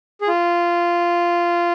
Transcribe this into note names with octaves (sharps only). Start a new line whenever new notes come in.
G#4
F4